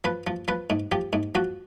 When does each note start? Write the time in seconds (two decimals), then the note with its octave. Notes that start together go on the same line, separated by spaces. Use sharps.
0.04 F3 B4
0.27 F3
0.48 F3 B4
0.70 G#2
0.92 F3 G4
1.13 G#2
1.35 F3 F#4